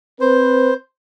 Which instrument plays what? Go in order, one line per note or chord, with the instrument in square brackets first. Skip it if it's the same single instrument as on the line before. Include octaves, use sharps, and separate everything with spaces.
[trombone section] C4 B4 [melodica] C5